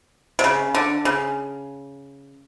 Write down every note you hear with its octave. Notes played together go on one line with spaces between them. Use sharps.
C3
C#3
D3
C#3